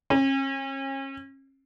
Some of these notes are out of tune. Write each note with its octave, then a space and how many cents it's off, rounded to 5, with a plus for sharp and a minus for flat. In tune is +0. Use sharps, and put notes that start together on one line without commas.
C#4 -40